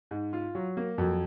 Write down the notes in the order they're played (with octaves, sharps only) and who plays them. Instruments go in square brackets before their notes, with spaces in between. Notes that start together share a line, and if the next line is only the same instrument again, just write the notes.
[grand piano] G#2
F4
F#3
A#3
[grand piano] F2 [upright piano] F#3